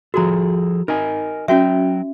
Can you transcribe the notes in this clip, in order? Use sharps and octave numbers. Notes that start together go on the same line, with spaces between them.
F3 F#4 G#4 A4 A#5
D#4 A#4 D#5 G#5
F#3 C#4 F#4 E5 G5